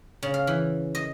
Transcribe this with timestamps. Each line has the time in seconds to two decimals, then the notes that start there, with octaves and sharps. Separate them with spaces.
0.23 C#3
0.34 F5
0.47 E3
0.95 D#5